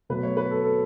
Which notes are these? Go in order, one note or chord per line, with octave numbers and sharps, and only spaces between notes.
B2 F#3 A3 B4
C#5
B4
A4
A4